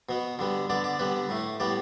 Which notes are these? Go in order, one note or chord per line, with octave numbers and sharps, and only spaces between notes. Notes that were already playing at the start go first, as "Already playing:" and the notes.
B2 B3
D3 G3 B3
D3 B3 D5
D5
D3 G3 B3 B4
A2 A3
A2 G3 B3 D5